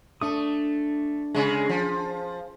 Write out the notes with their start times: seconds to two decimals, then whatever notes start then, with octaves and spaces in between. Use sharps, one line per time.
0.21 A3 D4 D#6
1.35 C#3 G#3
1.69 F3